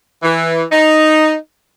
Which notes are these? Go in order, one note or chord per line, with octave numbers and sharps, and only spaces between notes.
E3
D#4